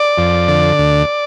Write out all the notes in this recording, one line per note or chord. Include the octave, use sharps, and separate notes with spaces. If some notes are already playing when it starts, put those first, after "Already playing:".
Already playing: D5
F2
D3
D2